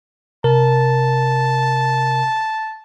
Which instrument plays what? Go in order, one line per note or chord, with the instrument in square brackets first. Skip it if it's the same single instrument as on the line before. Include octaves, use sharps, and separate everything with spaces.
[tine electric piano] C3 A#4 [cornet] A5